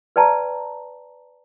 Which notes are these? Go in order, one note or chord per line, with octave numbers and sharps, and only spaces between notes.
B4 D5 G5 A5 A#5